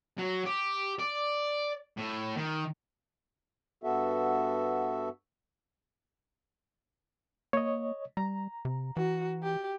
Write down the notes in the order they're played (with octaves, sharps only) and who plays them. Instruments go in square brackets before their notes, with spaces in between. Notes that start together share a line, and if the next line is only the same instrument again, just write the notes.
[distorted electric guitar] F#3
G4
D5
A2
D#3
[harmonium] G2 B3 F#4 A4 E5
[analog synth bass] A#3 [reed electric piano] C#5 D#5
[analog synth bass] G3 [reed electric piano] A#5
[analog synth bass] C3
[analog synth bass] E3 [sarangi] F#4
[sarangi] G4